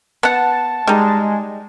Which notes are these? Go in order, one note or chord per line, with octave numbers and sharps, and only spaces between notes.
B3 F#5 A5
G3 G#3 D#4